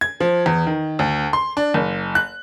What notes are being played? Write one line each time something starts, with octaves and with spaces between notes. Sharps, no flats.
G#6
F3
E2
D#3
D2
C6
D4
F#1
F#6